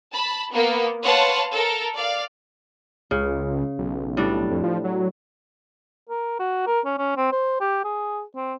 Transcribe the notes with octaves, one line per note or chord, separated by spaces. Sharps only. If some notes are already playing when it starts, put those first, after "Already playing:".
A5 B5
A#3 B3
B4 C#5 F5 F#5 A5 C6
A4 A#4
D5 F5
C#2 C#3
B1
A2 G3 D4
F2
F3
F#3
A#4
F#4
A#4
C#4
C#4
C4
C5
G4
G#4
C4